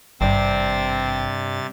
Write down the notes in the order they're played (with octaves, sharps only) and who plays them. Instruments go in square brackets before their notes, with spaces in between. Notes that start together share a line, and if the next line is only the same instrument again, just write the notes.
[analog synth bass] G#1 [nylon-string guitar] G2 [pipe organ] C3 A6 [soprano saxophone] C4